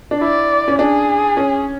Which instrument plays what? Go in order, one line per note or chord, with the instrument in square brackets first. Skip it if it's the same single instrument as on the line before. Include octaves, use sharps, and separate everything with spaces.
[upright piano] D4
[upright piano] E4 [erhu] D5
[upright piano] C#4
[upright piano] D4 [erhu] G#4
[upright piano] C#4